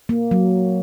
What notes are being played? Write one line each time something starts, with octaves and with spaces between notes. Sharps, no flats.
A#3
F#3